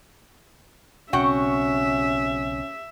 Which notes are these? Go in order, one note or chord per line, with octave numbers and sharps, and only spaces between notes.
B1 C#3 C4 C#4 F#4 E5 F#5 G5